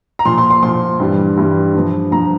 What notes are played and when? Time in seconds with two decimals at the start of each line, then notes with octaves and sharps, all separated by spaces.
0.19 A#5
0.25 A#2 F3 C6
0.38 C6
0.51 C6
0.63 A#2 F3 C6
1.00 G2 E3 G3
1.37 G2 E3 G3
1.74 G2 F3
2.11 G2 F3 A#5